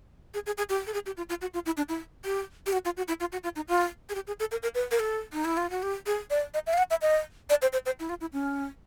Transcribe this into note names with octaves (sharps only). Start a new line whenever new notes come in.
G#4
G#4
G#4
G4
A4
G#4
G4
F4
F4
F#4
F4
E4
D4
E4
G4
G4
F#4
F4
F#4
E4
F4
F#4
F4
D#4
F4
G#4
G4
G#4
A4
A#4
A#4
B4
A#4
A4
D#4
E4
F4
F#4
G4
G#4
D5
D#5
E5
F5
F#5
E5
D#5
D5
C5
C5
C5
E4
F4
E4
C#4